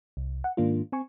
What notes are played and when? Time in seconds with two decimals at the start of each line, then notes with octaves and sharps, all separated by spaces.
0.17 C2
0.44 F#5
0.57 G#2 D#3 A#3 D4 F4
0.92 C4 G#5 C#6